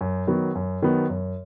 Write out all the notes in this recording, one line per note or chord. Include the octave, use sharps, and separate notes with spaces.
F#2
D#3 F#3 B3
F#2
D#3 F#3 B3
F#2